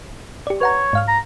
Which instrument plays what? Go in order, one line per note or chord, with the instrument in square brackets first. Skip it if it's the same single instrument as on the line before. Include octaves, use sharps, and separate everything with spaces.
[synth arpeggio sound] G4 D5
[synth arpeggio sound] B4 F#5 A#5 [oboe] C#5
[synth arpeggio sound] G#2 F5 F6
[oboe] A#5